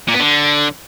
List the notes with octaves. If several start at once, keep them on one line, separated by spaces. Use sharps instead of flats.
A#2
B3
D3